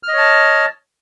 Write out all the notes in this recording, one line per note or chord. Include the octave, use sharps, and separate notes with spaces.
C#5 D#5 A5 F6